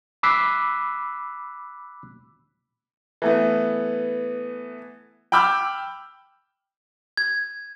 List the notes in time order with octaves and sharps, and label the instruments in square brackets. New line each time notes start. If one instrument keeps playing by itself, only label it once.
[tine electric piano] B5 D6 E6 F#6 B6 C7
[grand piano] E3 A3 B3
G5 B5 D6 E6 F6 G6
[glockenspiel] G#6